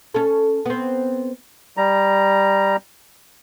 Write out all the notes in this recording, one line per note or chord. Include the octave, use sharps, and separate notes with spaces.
C#4 A4
B3 C4
G3 A#5